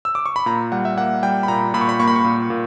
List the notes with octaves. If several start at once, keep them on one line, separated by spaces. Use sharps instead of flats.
E6
D6
C#6
B5
A#2 A#5
G3 F#5
E5
A#3 F#5
G3 G5
B5
A#2 A#5
A#2 B5
C#6
B5
A#3 C#6
B5
C#6
A#2
A#2